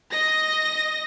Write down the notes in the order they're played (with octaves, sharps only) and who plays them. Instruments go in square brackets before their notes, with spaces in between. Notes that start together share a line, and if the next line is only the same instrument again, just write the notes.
[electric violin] D#5 A#6